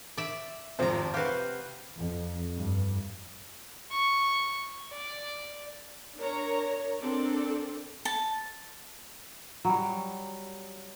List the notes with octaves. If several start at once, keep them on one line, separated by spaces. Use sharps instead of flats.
D5 E5
G#1 F2 C3 F3 A#5
F#4 G4 B4 F5
F2
G2
C#6
D5
D4 A#4 C#5 A#5
C4 D4 A4 A#4 D5
A5
F#3 G3